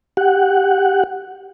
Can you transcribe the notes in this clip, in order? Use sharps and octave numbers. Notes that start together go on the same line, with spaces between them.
G4 F#5